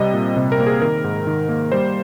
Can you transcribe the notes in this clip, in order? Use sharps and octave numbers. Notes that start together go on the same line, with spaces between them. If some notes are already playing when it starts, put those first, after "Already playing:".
Already playing: C3 G3 D#5
A#2
C3
A#4
A#3
G#4
D#3 A#4
G#2
D#3
A#3
G3 C5